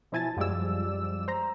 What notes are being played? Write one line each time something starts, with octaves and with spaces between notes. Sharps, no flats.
B2 F3 E4 G#5 A5 A6
F#2 F3 G3 G#3 D5 E6
C5 A#5